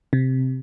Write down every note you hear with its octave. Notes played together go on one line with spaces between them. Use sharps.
C3